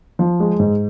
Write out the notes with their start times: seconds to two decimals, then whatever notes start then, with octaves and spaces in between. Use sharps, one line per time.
0.19 F3
0.40 G#3
0.59 G#2